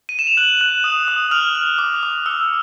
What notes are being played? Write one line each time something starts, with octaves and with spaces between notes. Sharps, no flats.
D#7
E7
F7
F#6 F#7
F#6
D#6
D#6
F6 F7
F6
D6
D6
E6